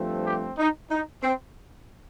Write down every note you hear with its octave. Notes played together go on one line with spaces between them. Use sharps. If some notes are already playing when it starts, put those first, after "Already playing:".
Already playing: G2 F3 A3 C4
G4
D#4
D#4
C4